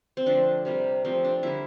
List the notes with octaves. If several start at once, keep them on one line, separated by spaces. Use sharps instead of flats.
C4
D3 F3 A3 D4
C3 G3 A#3
C3 F3 A3 C4
D4
D3 G3 A#3 E4